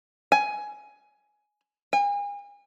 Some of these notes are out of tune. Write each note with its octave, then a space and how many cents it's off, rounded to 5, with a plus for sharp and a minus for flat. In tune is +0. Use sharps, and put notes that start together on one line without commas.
G#5 +10
G#5 -40